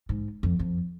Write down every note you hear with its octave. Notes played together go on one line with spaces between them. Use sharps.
G#2
F2
F2